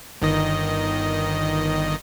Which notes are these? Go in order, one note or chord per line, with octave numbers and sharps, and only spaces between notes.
G1 D#3 D#5